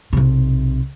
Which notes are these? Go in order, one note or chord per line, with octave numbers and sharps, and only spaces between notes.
B1 C3